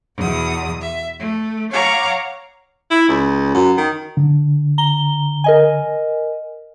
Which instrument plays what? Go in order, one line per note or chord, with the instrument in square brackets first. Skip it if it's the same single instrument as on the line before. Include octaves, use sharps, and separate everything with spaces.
[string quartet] E2 B2 D#6
E5
A3
C#5 F5 F#5 A#5 C#6 D6
[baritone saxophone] E4
C#2
F#2
D#3
[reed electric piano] D3
[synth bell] A#5 G7
A#4 D#5 G#5